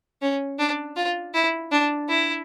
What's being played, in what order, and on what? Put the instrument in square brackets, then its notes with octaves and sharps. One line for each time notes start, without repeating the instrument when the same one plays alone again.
[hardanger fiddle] C#4
D4
F4
E4
D4
E4